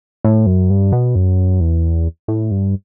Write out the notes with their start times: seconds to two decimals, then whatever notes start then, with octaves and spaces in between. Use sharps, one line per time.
0.25 A2
0.46 F#2
0.70 G2
0.92 B2
1.15 F#2
1.60 E2
2.28 A2
2.51 G2